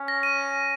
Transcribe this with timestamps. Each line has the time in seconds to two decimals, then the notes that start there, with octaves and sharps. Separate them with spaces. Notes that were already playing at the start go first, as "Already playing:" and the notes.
Already playing: C#4
0.08 A#6
0.23 D#7